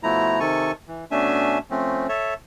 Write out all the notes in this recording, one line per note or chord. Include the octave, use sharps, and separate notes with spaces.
B2 F3 A3 E4 A#5
C3 D#3 A4 G#5 C#6
E3
B2 A3 C#4 D4 E5 G#5
F3 A3 C4 C#4
A4 C#5 E5